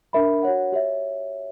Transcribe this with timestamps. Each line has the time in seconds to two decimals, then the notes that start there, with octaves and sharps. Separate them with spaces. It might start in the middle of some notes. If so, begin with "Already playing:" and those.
0.13 D4 A#4 E5 B5
0.43 F#4 C#5 F#5
0.72 G4 C#5 E5